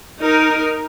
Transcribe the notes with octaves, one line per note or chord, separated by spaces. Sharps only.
D#4 A#4